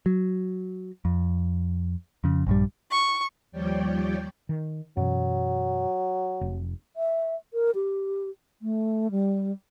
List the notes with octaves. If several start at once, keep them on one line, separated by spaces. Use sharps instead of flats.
F#3
F2
F2 C#3
A#1 G2 G3
C#6
D#2 F3 G3 C#5 D5 G5
D#3
F#2 B2 E3 F#3
F1
E5
A#4
G4
A3
G3